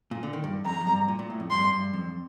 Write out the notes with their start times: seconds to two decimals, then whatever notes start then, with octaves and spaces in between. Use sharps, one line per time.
0.11 A#2
0.23 D3
0.33 D#3
0.44 G2
0.65 F2 A#5
0.81 F2
0.87 G2
1.08 A#2
1.19 A#2
1.30 A2
1.40 F2
1.50 G2 C6
1.73 G2
1.93 F2